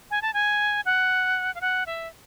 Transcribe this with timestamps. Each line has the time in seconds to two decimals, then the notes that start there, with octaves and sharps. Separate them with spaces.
0.11 G#5
0.22 A5
0.34 G#5
0.85 F#5
1.55 F5
1.61 F#5
1.86 E5